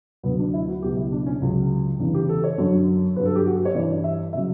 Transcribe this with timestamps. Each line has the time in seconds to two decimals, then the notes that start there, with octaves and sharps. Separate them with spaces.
0.23 D2 D3 F#3 B3
0.39 D4
0.54 E4
0.68 F#4
0.82 C#2 B2 F#3 G4
0.96 E4
1.12 D4
1.26 C#4
1.41 C#2 C#3 F#3
1.99 E2 C#3 E3 D4
2.14 G4
2.29 A4
2.44 C#5
2.58 F#2 D3 F#3
3.16 G2 D3 F#3 B4
3.25 A4
3.36 G4
3.46 F#4
3.56 G4
3.65 C#5
3.75 G2 E3 D5
4.04 E5
4.33 C#3 F#3 E5